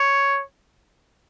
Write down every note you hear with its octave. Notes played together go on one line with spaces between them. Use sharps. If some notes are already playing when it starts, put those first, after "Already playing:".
Already playing: C#5